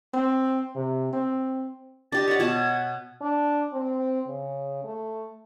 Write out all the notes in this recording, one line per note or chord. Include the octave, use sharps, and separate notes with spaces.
C4
C3
C4
D4 G4 D#5 A6
C#5 F#5
B2 C#5 A5 G#6
D4
C4
C#3
A3